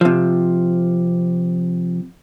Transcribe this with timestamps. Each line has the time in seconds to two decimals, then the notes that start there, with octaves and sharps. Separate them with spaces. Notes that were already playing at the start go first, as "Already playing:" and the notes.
0.01 C3 F3